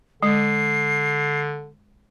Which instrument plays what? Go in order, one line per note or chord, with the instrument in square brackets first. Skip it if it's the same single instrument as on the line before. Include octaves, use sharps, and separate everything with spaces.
[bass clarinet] D3 [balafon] G#3 [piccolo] C7